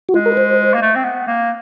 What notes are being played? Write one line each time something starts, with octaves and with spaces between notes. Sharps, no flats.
F#4
G#3 F4
A#4
B4
C5
A#3
A3
C4
B3
A#3